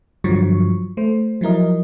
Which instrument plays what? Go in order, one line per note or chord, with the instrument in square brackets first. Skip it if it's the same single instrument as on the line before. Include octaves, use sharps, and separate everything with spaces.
[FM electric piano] G2 D3 F3 F#3 C#6
A3 C5
F3 F#3 E4 A#4 D#5